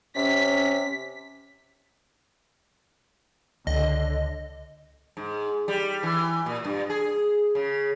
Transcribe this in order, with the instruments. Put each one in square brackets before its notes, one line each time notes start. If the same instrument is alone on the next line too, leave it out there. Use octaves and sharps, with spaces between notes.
[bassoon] C3 [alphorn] C#4 [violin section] B6
[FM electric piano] C#2 [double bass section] D3 [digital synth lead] D#5
[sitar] G#2
G3
E3
A#2
G2
G#4
C#3